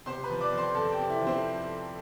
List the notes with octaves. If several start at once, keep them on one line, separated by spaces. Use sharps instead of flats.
C3 C5 C6
B4 B5
F3
D5 D6
F2
C5 C6
F2 A4 A5
G4 G5
C3
E4 E5
F3
C4 C5